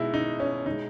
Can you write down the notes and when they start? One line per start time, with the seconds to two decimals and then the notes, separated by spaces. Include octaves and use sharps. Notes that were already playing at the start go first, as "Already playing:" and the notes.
Already playing: B2 G#3 D#4 E4
0.14 D#4
0.40 C#4
0.66 B2 G#3 D#4